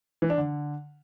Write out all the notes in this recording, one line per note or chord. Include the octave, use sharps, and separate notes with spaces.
E3
D4
D3